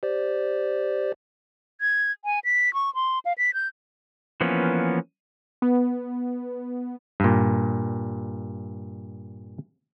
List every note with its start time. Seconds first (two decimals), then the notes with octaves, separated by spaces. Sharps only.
0.03 G4 C5 D5
1.80 G#6
2.25 G#5
2.44 B6
2.74 C#6
2.95 C6
3.25 F5
3.38 B6
3.54 G6
4.41 E3 F3 A#3 B3 C#4
5.62 B3
7.20 G2 A#2